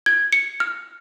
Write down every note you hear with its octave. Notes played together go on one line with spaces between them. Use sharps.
G#6
C#7
F6